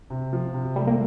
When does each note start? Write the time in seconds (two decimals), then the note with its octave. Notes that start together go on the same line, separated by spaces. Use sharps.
0.10 C3
0.33 F3
0.54 C3
0.76 G3 A3
0.87 A#3